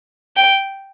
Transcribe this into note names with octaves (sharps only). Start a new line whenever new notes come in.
G5